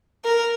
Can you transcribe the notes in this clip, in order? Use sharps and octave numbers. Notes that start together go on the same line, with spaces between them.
A#4